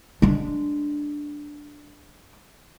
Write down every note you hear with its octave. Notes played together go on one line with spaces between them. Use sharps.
G#3 D4